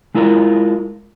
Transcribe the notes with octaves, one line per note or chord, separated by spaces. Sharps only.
G#3 E4 F4 A#4